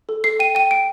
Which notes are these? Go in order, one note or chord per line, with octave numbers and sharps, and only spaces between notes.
A4
A4 C7
G5 D#7
G5 D#7
G5 D7